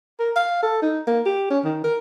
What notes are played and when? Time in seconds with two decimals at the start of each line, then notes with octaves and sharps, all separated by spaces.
0.19 A#4
0.36 F5
0.63 A4
0.82 D#4
1.07 A#3
1.26 G4
1.50 C#4
1.64 D#3
1.84 A#4